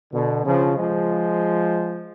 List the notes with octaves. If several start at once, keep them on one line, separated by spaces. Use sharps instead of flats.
B2 D3
C#3 F3
F3 G#3